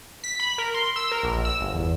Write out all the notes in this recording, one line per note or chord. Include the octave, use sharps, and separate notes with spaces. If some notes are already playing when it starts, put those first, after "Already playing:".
B6
B5
A#4
C6
E6
A#4
A#1
E6
G1
E2